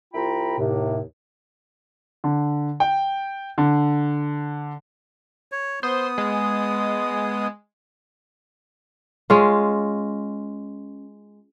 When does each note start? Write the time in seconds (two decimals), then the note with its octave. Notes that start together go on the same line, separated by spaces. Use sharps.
0.14 C2 E4 F4 G5 A#5 B5
0.59 D#2 A2 C3
2.24 D3
2.80 G5
3.58 D3
5.52 C#5
5.83 B3 C5 D#6
6.18 G#3
9.30 G#3 C#4 F4